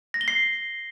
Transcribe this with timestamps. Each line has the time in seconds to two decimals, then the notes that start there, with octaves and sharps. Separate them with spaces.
0.14 A#6
0.21 G7
0.28 C7